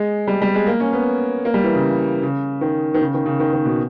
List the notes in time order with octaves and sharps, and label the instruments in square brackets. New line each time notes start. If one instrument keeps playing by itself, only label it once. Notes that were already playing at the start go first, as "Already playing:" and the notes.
Already playing: [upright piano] G#3
G3
G3
G#3
A#3
C#4
B3
A#3
G3
E3
C#3
C#3
D#3
D#3
C#3
D#3
C#3
D#3
D#3
B2